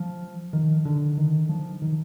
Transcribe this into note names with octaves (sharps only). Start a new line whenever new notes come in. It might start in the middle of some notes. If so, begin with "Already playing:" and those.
Already playing: F3
D#3
D3
D#3
F3
D#3